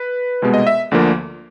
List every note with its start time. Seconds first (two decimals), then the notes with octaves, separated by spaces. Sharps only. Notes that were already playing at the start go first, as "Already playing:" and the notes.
Already playing: B4
0.42 C2 B2 G#3 B3
0.54 D#5
0.67 E5
0.91 D2 D3 F3 A#3